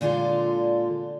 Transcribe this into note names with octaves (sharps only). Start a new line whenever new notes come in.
A#2 D3 G#3 F4 A4